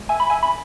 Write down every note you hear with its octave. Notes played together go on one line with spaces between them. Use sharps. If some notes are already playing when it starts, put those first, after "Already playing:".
Already playing: G#3
E5 G#5
B5
E5 G#5
B5